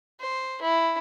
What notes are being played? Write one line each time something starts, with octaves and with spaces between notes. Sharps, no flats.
C5
E4